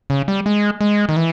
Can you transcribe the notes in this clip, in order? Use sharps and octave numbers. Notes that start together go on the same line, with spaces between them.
C#3
G3
G#3
G#3
D#3
E3